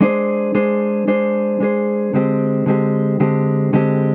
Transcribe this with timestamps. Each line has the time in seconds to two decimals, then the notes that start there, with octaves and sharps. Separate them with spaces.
0.01 G#3 D4 G#4 C5
0.55 G#3 D4 G#4 C5
1.07 G#3 D4 G#4 C5
1.60 G#3 D4 G#4 C5
2.13 D3 G#3 C4 G4
2.66 D3 G#3 C4 G4
3.20 D3 G#3 C4 G4
3.73 D3 G#3 C4 G4